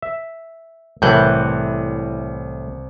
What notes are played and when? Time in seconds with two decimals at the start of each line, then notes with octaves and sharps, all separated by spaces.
0.02 E5
1.02 C2 A2 E3 E4 F#6 G6